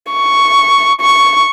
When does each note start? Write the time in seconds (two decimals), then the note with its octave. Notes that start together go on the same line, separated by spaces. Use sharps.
0.12 C#6
1.01 C#6